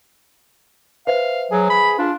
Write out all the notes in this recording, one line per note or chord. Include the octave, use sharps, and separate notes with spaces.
B4 C5 E5 F5
F#3 G#4
B5
D4 F4